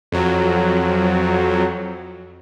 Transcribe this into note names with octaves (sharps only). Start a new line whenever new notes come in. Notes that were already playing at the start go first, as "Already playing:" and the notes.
F2 F#3